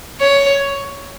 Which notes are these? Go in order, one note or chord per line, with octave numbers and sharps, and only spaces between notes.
C#5